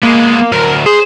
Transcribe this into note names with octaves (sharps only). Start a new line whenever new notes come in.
G#3 A#3 B3
D2 F#3 A#4
G#4 C5